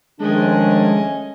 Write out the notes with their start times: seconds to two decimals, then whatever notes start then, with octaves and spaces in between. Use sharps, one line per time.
0.20 D#3 F3 G#3 A3 C#4 D4 D#5 G#5